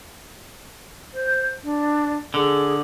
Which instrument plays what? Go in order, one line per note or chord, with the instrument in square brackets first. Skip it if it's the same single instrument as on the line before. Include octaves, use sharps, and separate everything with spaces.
[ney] C5
D4
[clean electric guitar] D3 [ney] G#4